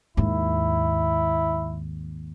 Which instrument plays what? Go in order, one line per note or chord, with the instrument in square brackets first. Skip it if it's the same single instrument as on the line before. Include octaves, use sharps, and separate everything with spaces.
[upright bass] D#2 G#2 [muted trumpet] E4